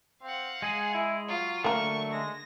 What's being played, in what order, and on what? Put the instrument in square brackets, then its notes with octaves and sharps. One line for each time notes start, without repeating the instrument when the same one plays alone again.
[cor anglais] C4 [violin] F5 F#5
[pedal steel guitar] G#3 G#4 [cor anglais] G#5
[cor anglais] E4
[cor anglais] F#3 [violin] F4
[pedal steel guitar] D3 A3 [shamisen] A#3 A#4 [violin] C#6
[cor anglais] G#3 [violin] A#6